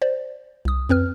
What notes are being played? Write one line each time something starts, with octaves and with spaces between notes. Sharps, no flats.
C5 D5
C2 D#6
F2 C4 B4 F6